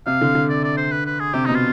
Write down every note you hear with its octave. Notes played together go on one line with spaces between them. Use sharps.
C3 F5
D3
D3
D5
D5
C5
B4
B4
G#4
C3 G4
B2 D#4
F4